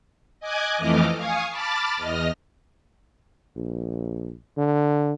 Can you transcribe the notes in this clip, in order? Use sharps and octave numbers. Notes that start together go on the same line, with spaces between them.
D#5 G#5 D6 F#6 G#6
F2 E3 A3 D#5 D6 F6
F5 G#5 C#6 D#6
A5 B5 D6 F6 A6
E2 D#5 F6 A#6
A#1
D3